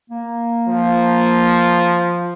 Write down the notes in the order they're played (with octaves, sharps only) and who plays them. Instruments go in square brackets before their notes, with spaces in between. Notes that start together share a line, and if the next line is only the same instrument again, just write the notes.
[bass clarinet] A#3
[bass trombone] F3